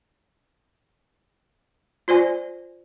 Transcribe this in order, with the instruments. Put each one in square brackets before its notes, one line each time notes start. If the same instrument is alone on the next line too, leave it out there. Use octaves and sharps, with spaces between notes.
[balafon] F4 C5 D5 G#5